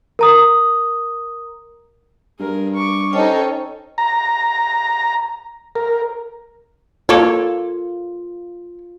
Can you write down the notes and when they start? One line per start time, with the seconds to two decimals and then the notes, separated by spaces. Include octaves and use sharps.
0.19 A#4 A#5 D#6
2.40 G2 G#4 A#4
2.75 C#6 D6
3.13 C#4 D#4 A4 C5 C#5 D#5 G5
3.98 A#5
5.76 A#4
7.09 A#3 F4 A4 C#5